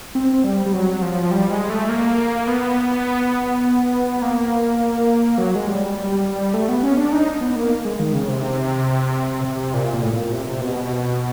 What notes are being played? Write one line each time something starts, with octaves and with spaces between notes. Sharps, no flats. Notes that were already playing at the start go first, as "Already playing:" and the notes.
C4
G3
G3
F#3
F3
G3
G#3
A3
A#3
B3
A#3
F#3
G#3
G3
A3
B3
C#4
D4
D#4
B3
A#3
G#3
D#3
C#3
C3
C3
A#2
A#2
A2
A2
A#2
C3
C3
B2